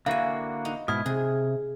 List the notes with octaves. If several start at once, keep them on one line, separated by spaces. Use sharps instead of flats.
D3 A#3 E4 F#4 F5 G#5
D#4
G#2 B2 E4 D#6 F6 G#6
C3 G#4